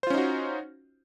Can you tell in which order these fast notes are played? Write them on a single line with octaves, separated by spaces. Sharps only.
C5 F4 C#4 D#4 F#4